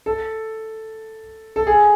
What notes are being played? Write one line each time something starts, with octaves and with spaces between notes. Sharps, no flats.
A4
A4
G#4